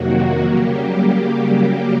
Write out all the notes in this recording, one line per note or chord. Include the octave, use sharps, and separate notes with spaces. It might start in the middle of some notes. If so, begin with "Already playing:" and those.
Already playing: F2 C3 D#3 F#3 A#3 F#4
C#3 F#3 G3 A#3 G4